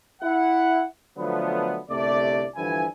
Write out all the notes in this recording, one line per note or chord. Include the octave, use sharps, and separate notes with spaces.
E4 F#5
D3 F3 F#3 A3 B3
G1 C2 C3 A3 D5
G2 D3 E3 F3 E4 G#5